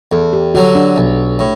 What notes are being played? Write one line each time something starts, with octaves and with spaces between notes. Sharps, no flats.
E2 A4
G4
D3 F#3 F#4
D4
B1
A2